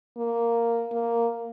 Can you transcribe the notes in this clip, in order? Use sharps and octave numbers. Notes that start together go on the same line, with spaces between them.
A#3
A#3